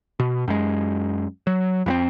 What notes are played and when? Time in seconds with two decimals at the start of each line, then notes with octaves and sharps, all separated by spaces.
0.20 B2
0.48 F#2 G#3
1.47 F#3
1.86 F2 A#3 C4